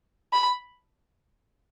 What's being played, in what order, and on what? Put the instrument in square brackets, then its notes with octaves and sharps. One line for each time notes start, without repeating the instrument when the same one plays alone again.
[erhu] B5